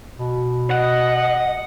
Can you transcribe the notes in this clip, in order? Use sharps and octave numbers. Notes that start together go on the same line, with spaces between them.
B2
D#5 F#5